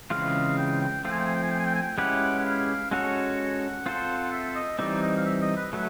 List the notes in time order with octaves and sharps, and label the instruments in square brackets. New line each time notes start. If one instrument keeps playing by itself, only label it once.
[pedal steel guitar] C#3 E3 G#3 C4 F4 [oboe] F5
[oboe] G5
G5
[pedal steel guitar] F3 A3 C4 F4 [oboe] G5
[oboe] G#5
G5
G#5
G5
G#5
G5
G#5
G5
G#5
G5
[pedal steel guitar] G#3 C#4 E4 G4 B4 [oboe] F#5
[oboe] F#5
F5
[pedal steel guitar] G#3 C#4 F#4 A4 C#5 [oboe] F#5
[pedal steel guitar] C4 F4 A4 C5
[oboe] E5
D#5
[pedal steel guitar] E3 G3 C4 D#4 [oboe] D5
[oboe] D#5
F5
E5
D#5
B4
[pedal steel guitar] F#3 A3 [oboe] B4